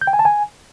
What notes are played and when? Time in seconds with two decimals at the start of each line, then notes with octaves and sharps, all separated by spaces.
0.01 G6
0.07 G5
0.13 G#5
0.19 A5
0.25 G#5